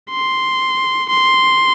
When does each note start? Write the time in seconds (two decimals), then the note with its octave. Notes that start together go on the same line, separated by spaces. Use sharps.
0.10 C6
1.10 C6